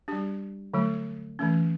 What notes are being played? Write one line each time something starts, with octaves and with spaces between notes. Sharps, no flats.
G3 D4 G4
D3 F#3 A3
E3 A3 C#4